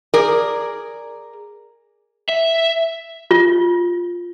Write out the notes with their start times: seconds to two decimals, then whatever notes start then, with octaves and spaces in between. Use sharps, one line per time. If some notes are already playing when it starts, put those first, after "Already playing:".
0.14 G#4 A#4 D5
2.29 E5
3.31 F4